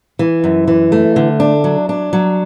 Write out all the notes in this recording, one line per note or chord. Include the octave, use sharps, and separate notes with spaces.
E3
F#2
E3
A3
D3
D4
F#3
D4
F#3